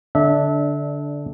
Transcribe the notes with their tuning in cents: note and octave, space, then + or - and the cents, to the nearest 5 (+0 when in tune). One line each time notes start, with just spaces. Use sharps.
D3 -15 D4 +0 E5 -30